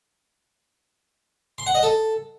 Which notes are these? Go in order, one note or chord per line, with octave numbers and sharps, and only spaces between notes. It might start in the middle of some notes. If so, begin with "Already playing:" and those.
C6
F#5
D#5
A4